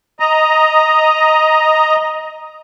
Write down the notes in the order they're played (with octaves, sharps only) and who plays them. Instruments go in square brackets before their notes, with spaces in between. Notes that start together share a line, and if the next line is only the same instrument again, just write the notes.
[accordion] D#5 A#5